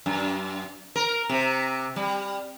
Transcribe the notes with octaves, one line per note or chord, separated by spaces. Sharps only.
F#2
A#4
C3
G3